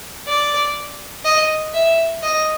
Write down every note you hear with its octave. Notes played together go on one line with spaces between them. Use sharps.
D5
D#5
E5
D#5